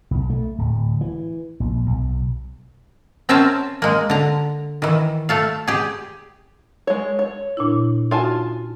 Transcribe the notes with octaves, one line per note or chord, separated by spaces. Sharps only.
B1
A3
D1
E3
A#1
B1
C4 C#4 A#4 E5 G#5 A5
G#3 A#3
D3 A#5
D#3 E3
A3 A4 F5
G4 G#4
G#3 C#5
C#5
A#2 D4 E4
D#4 F4 F#4 G#5 A5